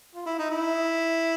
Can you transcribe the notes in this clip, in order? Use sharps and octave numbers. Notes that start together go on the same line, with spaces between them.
F4
E4
D#4
E4